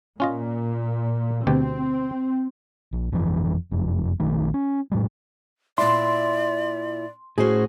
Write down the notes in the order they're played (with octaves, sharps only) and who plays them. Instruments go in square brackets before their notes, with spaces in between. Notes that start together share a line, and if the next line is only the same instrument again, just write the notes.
[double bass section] A#2 [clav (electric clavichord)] C#4 F4 D#5
[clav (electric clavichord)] D2 B2 G4 [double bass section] C4
[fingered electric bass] A#1
G1 F2 C#3 E3
F#1 F2
A#1 D#3 A3
C#4
A2 F#3 G#3
[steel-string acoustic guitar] A#2 E4 [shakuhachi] D5 [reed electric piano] C6
[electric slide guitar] A2 C5 [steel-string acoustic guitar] C#4 F#4 G#4